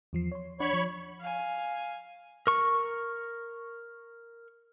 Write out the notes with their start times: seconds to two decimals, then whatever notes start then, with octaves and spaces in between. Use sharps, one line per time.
0.13 E2 F3 C7
0.32 C#5 C6
0.60 D4 C#5 D5 F#5 B5 C#6
0.73 F3
1.21 F5 G#5
2.47 A#4 C#6